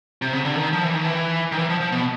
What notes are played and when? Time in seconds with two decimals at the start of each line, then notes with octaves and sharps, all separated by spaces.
0.22 C3
0.33 C#3
0.45 D3
0.56 D#3
0.73 F3
0.83 E3
0.94 D#3
1.05 E3
1.52 D#3
1.57 E3
1.69 F3
1.80 F3
1.92 B2